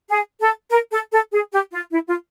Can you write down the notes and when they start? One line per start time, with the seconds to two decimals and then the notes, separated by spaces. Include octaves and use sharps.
0.09 G#4
0.41 A4
0.71 A#4
0.92 A4
1.12 A4
1.33 G#4
1.52 G4
1.72 F4
1.93 E4
2.08 F4